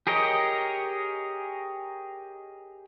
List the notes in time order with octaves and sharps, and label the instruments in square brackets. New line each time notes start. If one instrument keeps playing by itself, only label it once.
[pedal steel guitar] G4 G#4 A#4 C#5 D#5